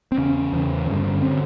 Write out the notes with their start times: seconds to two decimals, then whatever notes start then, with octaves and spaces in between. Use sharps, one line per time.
0.12 C4
0.18 E2 C#3 C#4
0.52 E2 C#3
0.87 G2 D3
1.22 D3 C4